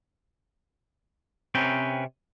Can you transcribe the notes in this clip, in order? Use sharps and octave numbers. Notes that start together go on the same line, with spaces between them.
C3 C4 C#4 A#4 B4 G5